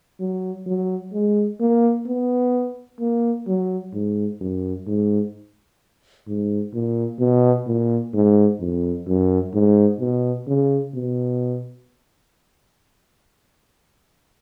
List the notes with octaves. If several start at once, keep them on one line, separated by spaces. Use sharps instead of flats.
F#3
F#3
G#3
A#3
B3
A#3
F#3
G#2
F#2
G#2
G#2
A#2
B2
A#2
G#2
F2
F#2
G#2
B2
C#3
B2